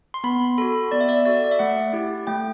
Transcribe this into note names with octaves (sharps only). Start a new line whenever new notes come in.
C6
B3 B5
F#4 A4 B5
B3 D5
E5
D5
F#4 A4 D5
D5
E5
A3 F#5
E4 G4
A3 G5